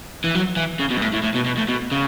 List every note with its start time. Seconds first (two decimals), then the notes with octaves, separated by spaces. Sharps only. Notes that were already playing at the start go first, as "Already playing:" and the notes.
0.24 E3
0.35 F#3
0.57 E3
0.79 C#3
0.90 B2
0.97 G2
1.02 A2
1.13 A2
1.24 A2
1.35 B2
1.46 B2
1.58 A2
1.69 B2
1.91 C#3